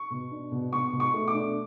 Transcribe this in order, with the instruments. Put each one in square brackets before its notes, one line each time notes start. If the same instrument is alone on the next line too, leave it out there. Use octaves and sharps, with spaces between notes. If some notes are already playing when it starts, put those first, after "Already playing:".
Already playing: [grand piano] C#6
B2
D4
B2
B2 C#6
B2
C#6
A3
D6
D4